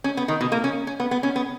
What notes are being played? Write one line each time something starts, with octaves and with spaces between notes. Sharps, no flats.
C#4
B3
D#3
B2
A#3
C#4
C#4
B3
B3
C#4
B3